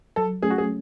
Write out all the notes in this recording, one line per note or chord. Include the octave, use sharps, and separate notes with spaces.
F#3 A4
A3 C#4 G#4
F#4
G#4